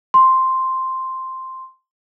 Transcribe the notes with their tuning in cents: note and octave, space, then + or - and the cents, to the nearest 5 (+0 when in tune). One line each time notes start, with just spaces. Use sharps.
C6 +0